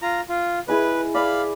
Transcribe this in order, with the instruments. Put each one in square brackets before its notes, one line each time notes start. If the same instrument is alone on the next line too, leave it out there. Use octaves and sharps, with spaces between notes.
[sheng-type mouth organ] F4 A#5
F4
[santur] E4 G#4 D#5 [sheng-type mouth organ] B4
[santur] B4 D5 [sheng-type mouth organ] F5 B5